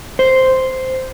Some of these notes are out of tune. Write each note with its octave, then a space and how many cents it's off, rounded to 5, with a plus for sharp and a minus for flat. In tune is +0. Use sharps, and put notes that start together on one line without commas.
C5 -5